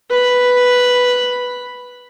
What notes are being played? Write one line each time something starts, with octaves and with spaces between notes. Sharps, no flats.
B4 B5